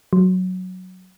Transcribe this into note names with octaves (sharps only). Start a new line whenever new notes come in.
F#3